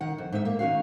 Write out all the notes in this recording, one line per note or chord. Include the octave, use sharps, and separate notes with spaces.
D#3 F#5
F2
G#2 D#4 E5
A#3
D#3 C#4 F#4 F5